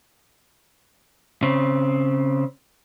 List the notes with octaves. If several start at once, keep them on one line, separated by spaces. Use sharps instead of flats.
C#3 C4